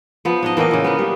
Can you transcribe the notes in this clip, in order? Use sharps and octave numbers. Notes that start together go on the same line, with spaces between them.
F3 B3
D4 D#4 D#5
E3 A#3 C4 D#5
C#3 E3
G#3 A#3 B3
G3